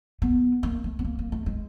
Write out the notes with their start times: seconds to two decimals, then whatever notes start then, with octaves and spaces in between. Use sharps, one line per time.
0.22 B3
0.63 A#3
0.84 A3
0.99 B3
1.04 A#3
1.19 A#3
1.32 A3
1.46 G#3